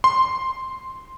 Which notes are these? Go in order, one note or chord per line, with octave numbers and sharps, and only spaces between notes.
C6